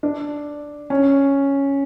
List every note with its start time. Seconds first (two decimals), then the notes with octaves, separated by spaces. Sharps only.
0.03 D4
0.90 C#4